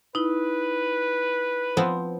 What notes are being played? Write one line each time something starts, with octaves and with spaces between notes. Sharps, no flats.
D#4 E4 B4
F3 B3 C4